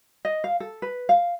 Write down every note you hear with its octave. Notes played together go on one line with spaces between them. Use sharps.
D#5
F5
A4
B4
F5